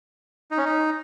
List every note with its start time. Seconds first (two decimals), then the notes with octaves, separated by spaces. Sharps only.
0.51 D#4
0.58 C#4
0.65 D#4